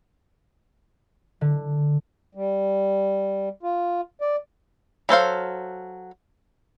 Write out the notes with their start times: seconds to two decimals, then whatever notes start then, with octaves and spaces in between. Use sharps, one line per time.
1.41 D3
2.35 G3
3.63 F4
4.21 D5
5.09 F#3 A4 C5 F5